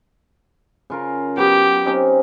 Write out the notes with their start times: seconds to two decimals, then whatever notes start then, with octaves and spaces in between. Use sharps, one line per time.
0.90 C#3 F4 A#4
1.37 F#3 B3 G4
1.85 C4 C#4 D#4